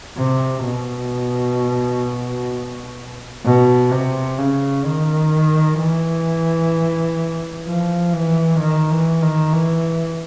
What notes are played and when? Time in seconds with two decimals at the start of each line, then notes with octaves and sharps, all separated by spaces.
0.18 C3
0.65 B2
3.45 B2
3.91 C3
4.38 C#3
4.86 D#3
5.79 E3
7.66 F3
8.13 E3
8.60 D#3
8.91 E3
9.22 D#3
9.53 E3